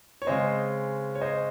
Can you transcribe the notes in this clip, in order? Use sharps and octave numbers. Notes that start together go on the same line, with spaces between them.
C#5
C#3 G#3 C4 C5 D#5
C#5
C5 D#5